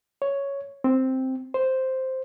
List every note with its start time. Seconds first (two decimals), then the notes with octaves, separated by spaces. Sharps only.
0.22 C#5
0.84 C4
1.54 C5